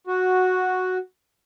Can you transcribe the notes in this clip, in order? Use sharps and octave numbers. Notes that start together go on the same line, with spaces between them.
F#4